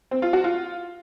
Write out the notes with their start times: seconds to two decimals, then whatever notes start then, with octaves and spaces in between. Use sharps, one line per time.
0.11 C4
0.22 F4
0.33 F#4
0.44 F4